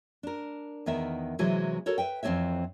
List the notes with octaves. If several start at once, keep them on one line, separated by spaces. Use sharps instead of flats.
D4 A#4
E2 D#3 B3 A#4 E5
C3 E3 F#3 G#3 E4
F#4 A4 A#4 C#5
B4 E5 G5
F2 E3 C4 D#4 C#5 E5